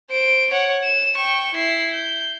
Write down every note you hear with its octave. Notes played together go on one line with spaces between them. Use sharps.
C5 D7
C#5 F#5
E7
G5 C#6
E4 C7
G6